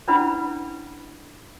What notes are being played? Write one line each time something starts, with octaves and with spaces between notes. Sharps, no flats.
C#4 D4 E4 B4 F#5 B5